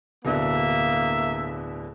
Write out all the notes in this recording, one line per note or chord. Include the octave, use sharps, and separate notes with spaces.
D1 B2 D3 A#3 E5